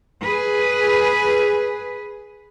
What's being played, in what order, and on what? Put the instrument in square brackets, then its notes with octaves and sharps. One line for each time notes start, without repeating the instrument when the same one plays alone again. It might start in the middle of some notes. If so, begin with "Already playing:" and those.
[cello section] G#4 B4